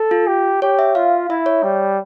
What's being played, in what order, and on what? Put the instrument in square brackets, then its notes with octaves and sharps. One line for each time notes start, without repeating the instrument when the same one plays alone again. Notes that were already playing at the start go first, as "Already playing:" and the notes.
Already playing: [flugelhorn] A4
[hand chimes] F4
[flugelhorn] G4
[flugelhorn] G4 [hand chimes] C#5
[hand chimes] E5
[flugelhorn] F4 [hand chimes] F5
[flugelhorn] E4 [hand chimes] E5
[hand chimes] C#5
[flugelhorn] G3